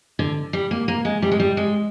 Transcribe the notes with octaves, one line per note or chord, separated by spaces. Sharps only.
D3
G3
A#3
A#3
G#3
G3
G#3
G3
G#3